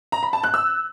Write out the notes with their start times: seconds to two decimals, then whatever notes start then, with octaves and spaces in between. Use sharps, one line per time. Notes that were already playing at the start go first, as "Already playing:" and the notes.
0.12 A#5
0.23 B5
0.33 A5
0.43 F#6
0.54 E6